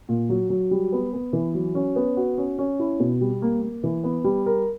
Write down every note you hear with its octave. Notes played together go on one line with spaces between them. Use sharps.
A#2
F#3
F#3
G3
B3
B3
E3
F#3
C#4
B3
F#4
C#4
C#4
E4
B2
G3
A#3
A#3
E3
B3
G3
A#4